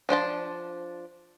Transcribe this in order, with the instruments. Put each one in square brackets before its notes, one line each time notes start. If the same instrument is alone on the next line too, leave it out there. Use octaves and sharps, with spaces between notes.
[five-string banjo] F3 D4 C5 A5